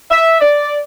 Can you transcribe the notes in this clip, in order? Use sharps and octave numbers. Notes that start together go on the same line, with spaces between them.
E5
D5